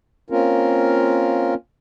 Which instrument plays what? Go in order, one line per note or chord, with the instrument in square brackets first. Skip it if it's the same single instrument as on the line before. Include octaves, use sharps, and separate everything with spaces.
[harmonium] A#3 C4 C#4 F4 A#4